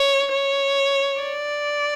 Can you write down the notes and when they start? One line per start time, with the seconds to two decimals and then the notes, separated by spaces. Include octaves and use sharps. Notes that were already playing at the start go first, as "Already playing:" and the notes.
Already playing: C#5
0.32 C#5
1.21 D5